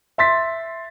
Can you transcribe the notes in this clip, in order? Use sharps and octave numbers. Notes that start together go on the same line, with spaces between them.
E5 C6 A6 B6